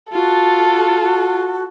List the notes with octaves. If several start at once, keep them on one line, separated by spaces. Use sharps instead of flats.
F4 F#4 A4
F#4